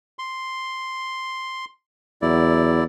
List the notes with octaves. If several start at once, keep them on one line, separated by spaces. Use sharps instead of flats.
C6
E2 F#3 E4 D5